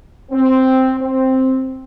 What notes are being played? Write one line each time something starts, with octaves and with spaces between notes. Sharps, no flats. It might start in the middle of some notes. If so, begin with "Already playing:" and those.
C4
C4